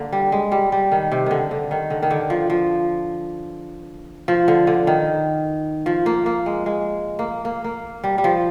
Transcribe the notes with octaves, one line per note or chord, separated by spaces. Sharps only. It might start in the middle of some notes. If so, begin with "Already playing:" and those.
Already playing: D3 A#3
G3
G#3
G3
G3
D#3
C3
D3 D#3
D3
D#3
D3
D#3
D3
F3
F3
F3
D3
D3
D#3
F3
A#3
A#3
G#3
G#3
A#3
A#3
A#3
G3
G3
F3